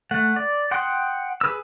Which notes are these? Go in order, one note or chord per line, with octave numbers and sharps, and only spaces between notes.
A3 F#5
D5
F#5 G5 C6 D#6
G#4 B4 E6